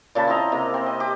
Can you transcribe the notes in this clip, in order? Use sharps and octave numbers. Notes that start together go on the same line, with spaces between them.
A#2 C#3 A5 B5
C4 E4 D#5 A#5
C3 A#3
C4
D#5
G4